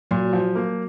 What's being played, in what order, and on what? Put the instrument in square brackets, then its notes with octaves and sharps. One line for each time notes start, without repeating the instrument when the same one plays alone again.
[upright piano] A#2 [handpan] F#3
[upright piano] F3
A#3